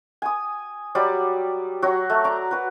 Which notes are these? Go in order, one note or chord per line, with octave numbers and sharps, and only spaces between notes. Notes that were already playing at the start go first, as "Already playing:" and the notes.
G#5 D#6
F#3 G3 D5
F#3 F#4 C#5
A3
D5 A#5
F#4 B4